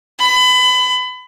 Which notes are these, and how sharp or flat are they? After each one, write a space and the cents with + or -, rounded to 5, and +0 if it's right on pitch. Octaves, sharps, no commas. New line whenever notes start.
B5 +30